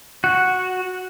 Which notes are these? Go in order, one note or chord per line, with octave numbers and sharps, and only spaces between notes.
F#4